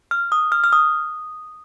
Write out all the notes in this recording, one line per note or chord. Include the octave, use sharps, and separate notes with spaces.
F6
D#6
F6
F6
D#6